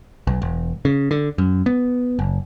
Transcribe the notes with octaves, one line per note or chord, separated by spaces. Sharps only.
B1
E1
C#3
D3
F#2
B3
F#1